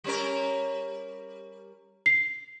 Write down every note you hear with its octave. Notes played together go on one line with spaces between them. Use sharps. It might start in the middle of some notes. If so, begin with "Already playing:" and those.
G3 C#4 A#4
C7